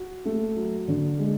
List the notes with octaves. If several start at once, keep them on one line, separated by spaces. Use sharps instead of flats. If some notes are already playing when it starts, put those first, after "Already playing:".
Already playing: F#4
A3
F#3
D3
G#3